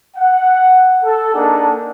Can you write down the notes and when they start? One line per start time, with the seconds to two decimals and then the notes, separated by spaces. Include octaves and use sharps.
0.17 F#5
1.04 A4
1.34 A#3 D4 D#4 G#4 A4 F#5